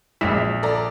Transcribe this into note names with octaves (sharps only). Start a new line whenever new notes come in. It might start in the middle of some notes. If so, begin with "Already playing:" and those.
A#1 F#2 G#3 E4 B6
A4 D5 A#5